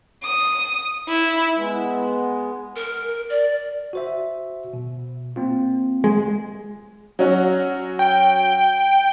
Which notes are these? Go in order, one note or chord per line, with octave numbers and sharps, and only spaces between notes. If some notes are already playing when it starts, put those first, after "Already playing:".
D#6
E4
G#3 B3
A#4
D5
F#4 C5 E5
B2
A#3 C4 F4
G#3
F#3 C#4 F#4
G5